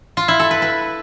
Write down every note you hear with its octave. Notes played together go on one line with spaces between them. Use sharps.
F4
E4
A4
B4
B4